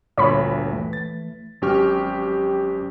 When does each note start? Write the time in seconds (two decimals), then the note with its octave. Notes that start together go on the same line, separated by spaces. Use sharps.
0.18 G1 D2 A#2 C#5 B5 B6
0.73 E3 A3
0.93 A6
1.62 G#1 F#3 C#4 G4 C#6 F6